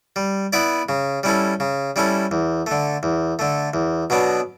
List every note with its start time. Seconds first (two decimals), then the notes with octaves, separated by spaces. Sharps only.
0.16 G3
0.53 B3 E4 B4 D5
0.89 C#3
1.23 G3 C#4 E4 A4
1.60 C#3
1.96 G3 C#4 E4 A4
2.31 E2
2.67 D3 A3
3.03 E2
3.39 D3 A3
3.74 E2
4.10 B2 F#3 B3 D4